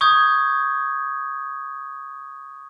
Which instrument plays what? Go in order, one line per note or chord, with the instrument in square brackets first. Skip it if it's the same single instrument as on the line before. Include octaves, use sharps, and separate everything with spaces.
[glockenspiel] C#6 D#6 G6 G#6